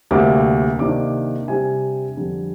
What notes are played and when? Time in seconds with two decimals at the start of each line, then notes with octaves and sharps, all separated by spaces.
0.11 D2 C3 G3 A#3 D6
0.79 C3 D#3 A#3 D4 D6
1.48 C3 G3 D4 G#5
2.17 F2 D3 G3 D4